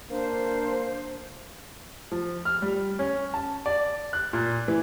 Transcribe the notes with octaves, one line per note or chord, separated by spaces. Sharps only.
A#3 D4 C5
F3
F6
G3
C#4
A5
D5
F#6
A#2
E3